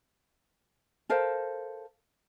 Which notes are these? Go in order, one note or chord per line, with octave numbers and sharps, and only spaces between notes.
A4 A#4 C5 F5